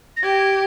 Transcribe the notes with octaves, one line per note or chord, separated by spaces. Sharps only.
A#6
G4 G#6